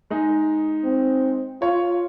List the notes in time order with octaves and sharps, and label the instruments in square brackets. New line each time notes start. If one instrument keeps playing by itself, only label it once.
[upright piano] G#3 D#4
[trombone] C4
[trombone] F4 [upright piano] C#5